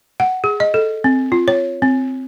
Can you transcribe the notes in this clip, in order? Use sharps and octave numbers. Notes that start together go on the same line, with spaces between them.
F#5
G#4
D#5
A4
C4
F4
C#5
C4